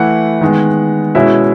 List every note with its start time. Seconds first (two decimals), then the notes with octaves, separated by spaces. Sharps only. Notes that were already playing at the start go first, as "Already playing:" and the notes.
Already playing: E3 A3 E4 F#5
0.41 D#3 G#3 B3
1.15 B2 G#3 C#4 E4 E5